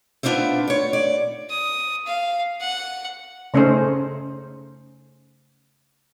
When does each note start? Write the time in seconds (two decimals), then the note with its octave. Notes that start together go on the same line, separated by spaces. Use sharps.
0.23 B3 D4 F4 C5 E5
0.68 C#5 D5
0.93 D5
1.50 D#6
2.07 F5
2.61 F#5
3.54 C#3 A3 C#4 D#4 C5